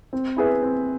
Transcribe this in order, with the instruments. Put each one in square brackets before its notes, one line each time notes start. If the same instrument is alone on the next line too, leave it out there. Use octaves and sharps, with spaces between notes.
[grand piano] C4
E4 G#4 B4 E5
C4